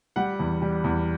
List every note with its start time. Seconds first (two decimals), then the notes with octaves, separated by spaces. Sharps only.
0.16 G3 F#5
0.39 E2
0.62 G3
0.84 E2